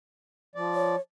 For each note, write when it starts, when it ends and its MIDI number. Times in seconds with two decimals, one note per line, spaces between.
0.56 0.96 53
0.56 0.96 74
0.74 1.00 73